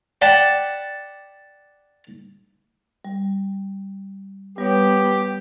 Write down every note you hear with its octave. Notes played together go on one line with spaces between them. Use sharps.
D5 F#5 G5 A5 B5
G3
G3 B3 G4 C#5